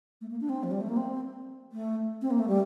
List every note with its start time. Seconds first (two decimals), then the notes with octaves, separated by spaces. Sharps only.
0.21 A3
0.31 A#3
0.41 D4
0.49 C4
0.63 F3
0.71 G3
0.81 A3
0.89 A#3
0.97 C4
1.72 A3
2.22 C4
2.31 A#3
2.39 A3
2.48 G3